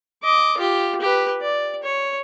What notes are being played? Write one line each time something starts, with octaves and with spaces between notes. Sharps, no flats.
D#5 D6
F4 G4
G4 B4
D5
C#5